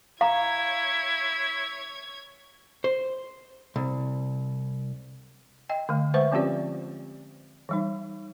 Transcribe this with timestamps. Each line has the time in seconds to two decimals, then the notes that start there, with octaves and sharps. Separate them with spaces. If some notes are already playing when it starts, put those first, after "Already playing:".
0.21 E4 C#5 F5 A#5 G#6
2.84 C5
3.76 C2
5.69 D#5 G5
5.89 D3 A3
6.14 G#3 B4 C5 E5 C#6
6.32 F3 C4 C#4 F4 G4 D5
7.69 E3 G3 D#4